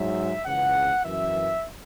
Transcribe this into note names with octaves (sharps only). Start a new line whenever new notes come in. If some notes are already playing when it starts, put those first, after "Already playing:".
Already playing: G#2 F#3 E5
C#2 C#3 E3 F#5
F#2 E3 E5